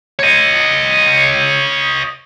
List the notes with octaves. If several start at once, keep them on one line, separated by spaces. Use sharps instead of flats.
C#5 D#5